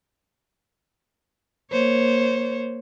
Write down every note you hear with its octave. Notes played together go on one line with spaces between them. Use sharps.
A#3 C5 C#5